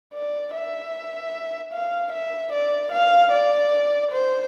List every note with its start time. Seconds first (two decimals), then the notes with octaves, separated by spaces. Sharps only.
0.14 D5
0.54 E5
1.73 F5
2.13 E5
2.53 D5
2.92 F5
3.32 D5
4.12 C5